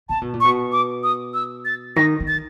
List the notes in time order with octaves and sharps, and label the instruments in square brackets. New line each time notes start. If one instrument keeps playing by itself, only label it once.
[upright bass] C3 [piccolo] A5
[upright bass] B2
A#2
[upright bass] B2 [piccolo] C#6
[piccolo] D6
D#6
E6
A6
[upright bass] D#3 [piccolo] A#6
[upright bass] D#3
[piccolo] A6